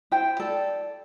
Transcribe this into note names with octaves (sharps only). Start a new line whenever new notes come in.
E4 C5 G5
A4 D5